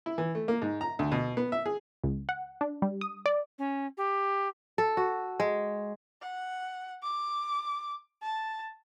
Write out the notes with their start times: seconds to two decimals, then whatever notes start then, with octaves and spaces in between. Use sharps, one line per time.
0.06 E4
0.18 E3
0.35 A3
0.48 A#3
0.62 G#2
0.81 A#5
0.99 D2
1.12 B2
1.37 B3
1.52 E5
1.66 G#4
2.04 C#2
2.29 F#5
2.61 D4
2.82 G3
3.01 D#6
3.26 D5
3.58 C#4
3.97 G4
4.78 A4
4.97 F#4
5.40 G#3
6.22 F#5
7.03 D6
8.22 A5